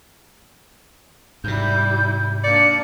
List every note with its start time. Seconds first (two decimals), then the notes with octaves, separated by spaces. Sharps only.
1.44 G#2 C3 G3 E4 G6
2.44 A#3 D4 D5 C#7